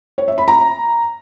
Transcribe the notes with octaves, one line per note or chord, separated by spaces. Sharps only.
C#5
E5
B5
A#5